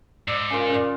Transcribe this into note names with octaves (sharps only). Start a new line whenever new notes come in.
G#2 D5 E6
C#3 F4 A#4 G#5
C#3 D5